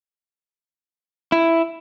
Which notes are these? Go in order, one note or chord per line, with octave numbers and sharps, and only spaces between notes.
E4